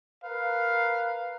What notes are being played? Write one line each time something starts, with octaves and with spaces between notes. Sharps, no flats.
A#4 B4 F5